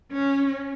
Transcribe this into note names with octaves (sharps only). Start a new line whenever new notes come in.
C#4